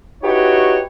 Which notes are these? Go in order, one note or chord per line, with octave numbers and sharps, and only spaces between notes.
D#4 E4 F#4 G4 B4 C#5